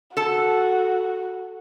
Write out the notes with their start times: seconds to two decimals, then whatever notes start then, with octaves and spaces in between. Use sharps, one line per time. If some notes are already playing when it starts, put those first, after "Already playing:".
0.17 F#4 A4 A5